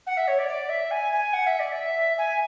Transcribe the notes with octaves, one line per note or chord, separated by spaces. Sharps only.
F#5
E5
C#5
D5
D5
E5
G#5
G#5
F#5
E5
D5
E5
G#5